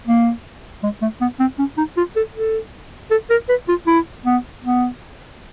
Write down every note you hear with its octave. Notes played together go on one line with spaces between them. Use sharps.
A#3
G#3
A3
B3
C4
C#4
D#4
F4
A4
A4
A4
A#4
B4
F4
E4
B3
B3